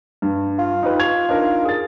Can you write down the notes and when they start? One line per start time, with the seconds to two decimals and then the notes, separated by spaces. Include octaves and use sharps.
0.22 G2
0.59 F4
0.83 D#4 G4 B4
0.99 C#6 G#6 F7
1.29 D4 D#4 A#4
1.65 G#4 A6